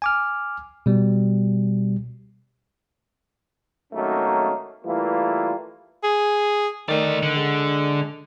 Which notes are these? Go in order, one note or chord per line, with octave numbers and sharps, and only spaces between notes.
G#5 D6 F6
B2 G3
G#1 F#3 A3 A#3 C#4 D#4
E3 G3 A3 A#3 F4
G#4
D#3 A3 D5
D3
G#3